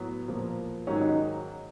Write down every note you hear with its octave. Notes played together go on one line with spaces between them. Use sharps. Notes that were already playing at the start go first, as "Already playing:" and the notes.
Already playing: A2 F#3 B3
A#2 F3
G#2 D#3 F#3 C#4
D#4